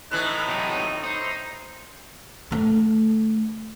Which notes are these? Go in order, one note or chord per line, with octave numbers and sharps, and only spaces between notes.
A2 E3 D#4 F#6
C3 F#3 D#6
D#4 C5
D3 A3